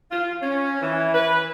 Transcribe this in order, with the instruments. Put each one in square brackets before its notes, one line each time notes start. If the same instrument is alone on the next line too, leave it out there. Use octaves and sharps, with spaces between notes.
[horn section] F4
C#4
E3
B4